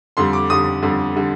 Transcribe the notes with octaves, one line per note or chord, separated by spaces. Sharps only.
F2 D3 G3 C6
D6
F2 D3 G3 D#6
F2 D3 G3
D3 G3